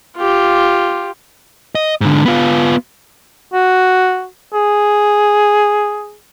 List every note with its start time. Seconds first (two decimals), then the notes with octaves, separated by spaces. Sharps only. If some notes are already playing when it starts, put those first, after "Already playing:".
0.17 F4 G4
1.75 D#5
2.01 G#2 D3
2.25 B3 F4
3.53 F#4
4.53 G#4